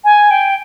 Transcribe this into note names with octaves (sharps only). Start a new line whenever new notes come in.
G#5
G5